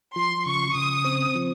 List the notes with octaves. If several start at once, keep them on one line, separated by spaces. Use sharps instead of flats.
F3 C6
C#3 C#6
C#3 D#6
C4
F3